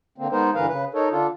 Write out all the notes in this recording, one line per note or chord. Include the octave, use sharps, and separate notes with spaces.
D3 A#3 C4
G#3 B3 D#4 A#4 C5
G2 D3 E3 A#4 B4 F5
C#3 B4
D#4 A4 A#4 C#5
D3 D4 F4 A4